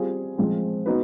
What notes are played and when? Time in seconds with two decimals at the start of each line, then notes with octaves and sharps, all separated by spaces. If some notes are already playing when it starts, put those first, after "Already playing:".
Already playing: G3 C4 F4 G#4
0.38 F3 G#3 C4
0.86 B3 D#4 F#4 B4